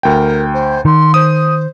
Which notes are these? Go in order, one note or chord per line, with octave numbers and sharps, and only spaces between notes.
D2 A#4 G5
C5
D#3 C6
C5 D#6